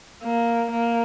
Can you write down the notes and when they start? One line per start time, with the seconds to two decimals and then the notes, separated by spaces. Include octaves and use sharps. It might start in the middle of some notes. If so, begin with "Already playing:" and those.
0.23 A#3
0.70 A#3